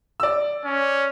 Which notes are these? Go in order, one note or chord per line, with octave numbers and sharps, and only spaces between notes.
D5 E6
C#4